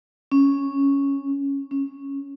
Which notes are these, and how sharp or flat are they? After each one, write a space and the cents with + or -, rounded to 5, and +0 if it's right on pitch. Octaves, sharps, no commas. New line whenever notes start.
C#4 -5
C#4 -10